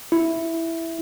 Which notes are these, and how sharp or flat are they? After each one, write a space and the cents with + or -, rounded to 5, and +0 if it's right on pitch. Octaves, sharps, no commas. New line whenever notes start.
E4 +0